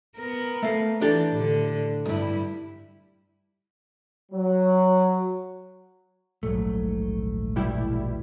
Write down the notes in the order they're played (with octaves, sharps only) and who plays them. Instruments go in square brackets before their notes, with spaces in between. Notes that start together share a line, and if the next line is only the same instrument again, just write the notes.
[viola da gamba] B3 A#4
[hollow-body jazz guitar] A3 F5
[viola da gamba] E3 [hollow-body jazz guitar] D4 G4 A4
[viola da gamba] A2 D3
[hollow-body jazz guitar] C2 G2 [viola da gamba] G3 E4
[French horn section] F#3
[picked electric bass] D#1 A#1 F#3 [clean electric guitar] G#2 A3
[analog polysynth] B2 G3 E4